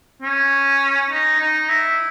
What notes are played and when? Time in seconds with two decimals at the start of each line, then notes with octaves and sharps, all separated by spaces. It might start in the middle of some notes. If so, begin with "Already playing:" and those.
0.22 C#4
1.11 D#4
1.40 D#4
1.69 E4